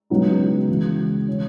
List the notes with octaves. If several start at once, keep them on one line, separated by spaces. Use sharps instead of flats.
C#2 C#3 F#3 B3 D#4
C#2 C#3 E3
E3 G#3 C#4